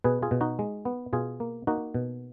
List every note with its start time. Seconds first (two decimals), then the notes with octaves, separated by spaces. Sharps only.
0.04 B2 G#4 B4
0.22 F4 G#4
0.31 B2
0.41 D#4 F#4
0.59 G#3
0.85 B3
1.13 B2 F4 G#4
1.40 A#3
1.67 A#3 D#4 F#4
1.94 B2